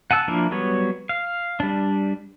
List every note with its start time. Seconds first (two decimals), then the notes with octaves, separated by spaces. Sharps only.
0.11 F#5 G#5 A5 E6 F#6
0.28 F3 A#3 D4 E4 A#4
0.51 F#3 G3 B3 C#5
1.09 F5
1.60 G3 D4